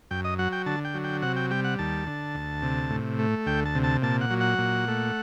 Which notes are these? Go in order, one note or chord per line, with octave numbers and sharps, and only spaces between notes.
F#2 G5
D#5
F#3 F#5
G5
D3 A5
G5
F#3
G5
C3 F#5
G5
G3 G5
F#5
D#2 A5
D3
D2
C3
A2
A3
D2 G5
A5
C3
A5
A#2 A5
F#5
F#3
F#5
A#2
A3